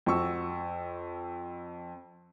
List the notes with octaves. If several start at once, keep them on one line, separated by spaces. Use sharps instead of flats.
F2 F#4 C#6 E6